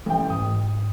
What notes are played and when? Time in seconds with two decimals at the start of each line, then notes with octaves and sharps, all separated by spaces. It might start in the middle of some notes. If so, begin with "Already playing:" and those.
0.06 A1 A2 G5
0.30 G#2 D#6